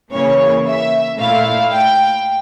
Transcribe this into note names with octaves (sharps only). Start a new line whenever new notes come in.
C#3 E3 A#3 C#5
E5
A#2 A3 E4 F5
G5